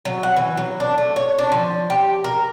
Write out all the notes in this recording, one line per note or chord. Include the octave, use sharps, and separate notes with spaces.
F#3
F#5
E3
F#3
D4
A3
C#5
D4
F3
G4
A#4